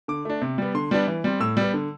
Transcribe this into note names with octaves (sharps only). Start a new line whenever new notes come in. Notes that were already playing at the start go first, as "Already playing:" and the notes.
D3 D6
A3 D4
C3
G3 B3
D3 C6
G3 B3 D4
E3
G3 C4
A2 E6
G3 B3
D3